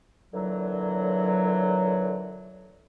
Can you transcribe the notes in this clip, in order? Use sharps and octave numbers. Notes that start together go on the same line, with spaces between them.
A#2 D3 E3 F#3